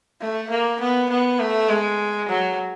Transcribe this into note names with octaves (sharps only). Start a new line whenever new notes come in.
A3
A#3
B3
B3
A3
G#3
F#3